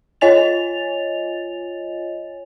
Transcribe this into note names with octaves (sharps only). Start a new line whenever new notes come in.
F4 C#5 D#5 G#5 A6 F7